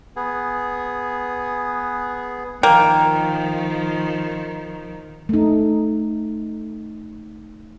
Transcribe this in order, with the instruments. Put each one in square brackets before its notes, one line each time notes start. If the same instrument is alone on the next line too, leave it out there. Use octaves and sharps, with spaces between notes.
[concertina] B3 G#4
[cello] D#3 F3 [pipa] A#3 [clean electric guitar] G5
[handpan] A3 D#4